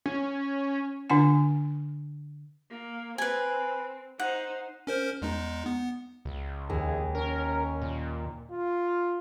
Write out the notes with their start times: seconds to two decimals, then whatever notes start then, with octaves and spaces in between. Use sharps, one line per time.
0.06 C#4
1.10 D3 D4 F#5 G#5
2.71 A#3
3.18 C4 B4 G#5
4.19 D#4 C5 F#5
4.87 C#4 A#4 C5
5.22 E2 G#3 D#4
5.66 B3
6.25 C#2
6.70 D#2 G#4
7.15 C#4 A#4
7.82 A#2
8.51 F4